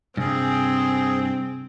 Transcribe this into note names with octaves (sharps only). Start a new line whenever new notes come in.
G2 C3 G3 C4 G#4